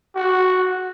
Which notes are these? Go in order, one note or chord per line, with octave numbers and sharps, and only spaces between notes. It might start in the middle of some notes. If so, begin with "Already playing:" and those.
F#4